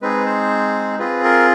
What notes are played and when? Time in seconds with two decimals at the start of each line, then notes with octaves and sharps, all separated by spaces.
0.02 G#3 C4 D#4 G#4 B4
0.26 C5
0.99 C4 F4 G#4 B4
1.24 A#4